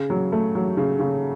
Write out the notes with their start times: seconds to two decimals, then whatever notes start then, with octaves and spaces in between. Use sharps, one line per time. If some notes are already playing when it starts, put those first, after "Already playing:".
Already playing: C#3
0.10 F#3
0.32 A3
0.55 F#3
0.77 C#3
0.99 C#3